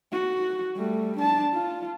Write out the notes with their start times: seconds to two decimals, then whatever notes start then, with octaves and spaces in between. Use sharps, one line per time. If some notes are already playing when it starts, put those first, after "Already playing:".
0.12 F#4
0.77 G3 A3
1.17 D4 A5
1.54 F4